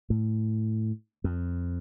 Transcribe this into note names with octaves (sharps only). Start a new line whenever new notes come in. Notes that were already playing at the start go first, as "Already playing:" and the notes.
A2
F2